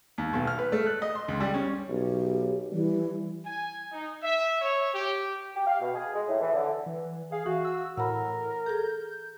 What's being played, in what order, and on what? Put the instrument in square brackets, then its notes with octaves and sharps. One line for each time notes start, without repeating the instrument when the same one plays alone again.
[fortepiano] D#2
B1
F6
B4
A3
F#6
D#5
C6
C#2
G3
C#4
[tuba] B1 [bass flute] G4
[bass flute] E3 [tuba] G3
[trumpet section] G#5
D#4
E5
C#5
G4
[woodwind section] G4
F5
B2
G#4
G#3
A2
E3
D3
[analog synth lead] E3
[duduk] G#4 [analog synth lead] F5
[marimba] E3 [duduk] F#4
[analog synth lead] E6
[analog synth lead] A2 [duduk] A#4 [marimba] F#5 B5
[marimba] G#4 A4 [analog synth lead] G6